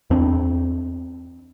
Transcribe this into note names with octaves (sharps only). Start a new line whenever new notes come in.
E2 C4 D4